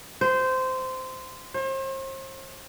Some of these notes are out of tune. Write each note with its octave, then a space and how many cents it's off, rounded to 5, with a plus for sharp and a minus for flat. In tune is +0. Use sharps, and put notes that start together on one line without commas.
C5 -15
C5 +40